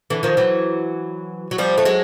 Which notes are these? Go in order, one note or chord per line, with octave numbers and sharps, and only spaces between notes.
D3 E3
D#3 F3
E3 F#3
F#3
F3 G3
A3
F#3 G#3